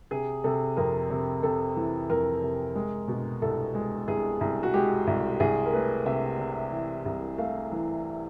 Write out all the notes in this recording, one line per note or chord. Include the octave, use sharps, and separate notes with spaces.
C3 G#4
C3 A4
F2 A#4
C3
C3 A4
E3
F2 A#4
C3
G#3
B2
C2 A4
G#3
C2 G#4
C2
F#4
G#3 G4
C2
C2 G#4
A#4
A3 B4
C3 E5
C3
E3
C2
A3 F5
E3